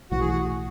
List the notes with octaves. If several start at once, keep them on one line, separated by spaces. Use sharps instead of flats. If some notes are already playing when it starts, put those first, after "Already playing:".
B1 A2 E3 F#4
G#4
F#4